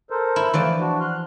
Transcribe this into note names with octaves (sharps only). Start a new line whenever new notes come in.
A4 A#4 C5
E4
E3 F3 A3 D5
D4 F#4
C6 F6 F#6